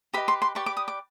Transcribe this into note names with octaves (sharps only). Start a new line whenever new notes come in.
G4 B4 D#5 B5
C6
C6
G4 B4 D5 C#6
D6
D#6
D6